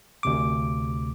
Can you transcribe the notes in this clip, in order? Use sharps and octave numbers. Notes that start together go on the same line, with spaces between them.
D2 C3 D6